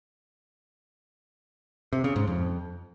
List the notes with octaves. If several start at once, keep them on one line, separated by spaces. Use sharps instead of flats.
C3
C#3
G#2
F2